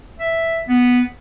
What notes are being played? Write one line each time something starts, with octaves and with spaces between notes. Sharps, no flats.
E5
B3